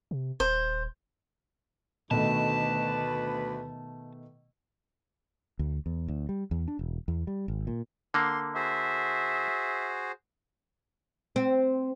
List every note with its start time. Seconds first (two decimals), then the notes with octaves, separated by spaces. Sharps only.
0.11 C3
0.40 D#1 C5
2.11 D2 B2 D#3 A3 B4 A5
5.59 D2
5.86 E2
6.08 D2
6.29 G3
6.51 E2
6.68 D4
6.79 E1
7.08 E2
7.27 G3
7.48 G#1
7.67 A#2
8.14 D3 A#3 C6
8.55 F#4 G#4 C5 E5
11.36 C4